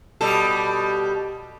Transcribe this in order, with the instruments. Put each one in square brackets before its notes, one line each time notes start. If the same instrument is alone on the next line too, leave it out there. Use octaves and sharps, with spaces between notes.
[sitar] B2 G3 A4